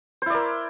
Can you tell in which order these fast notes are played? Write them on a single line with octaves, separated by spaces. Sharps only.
C5 E4 D5 A#4